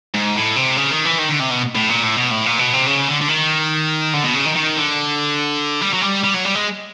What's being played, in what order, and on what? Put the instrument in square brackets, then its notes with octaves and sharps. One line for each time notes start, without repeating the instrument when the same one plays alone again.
[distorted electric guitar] G#2
A2
C3
C#3
D#3
E3
D#3
D3
C3
B2
A2
A#2
A2
B2
A2
A#2
B2
C3
C#3
D3
D3
D#3
D3
B2
C#3
D#3
D#3
D3
G3
F#3
G3
G3
F#3
G3
G#3